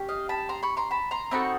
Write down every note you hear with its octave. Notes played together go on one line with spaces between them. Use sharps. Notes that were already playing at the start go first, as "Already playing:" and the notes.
Already playing: C#4 G4
D#5 F5
A5 B5
A#5 C6
B5 C#6
A#5 C6
A5 B5
A#5 C6
C4 D#4 F#4 A4 B5 C#6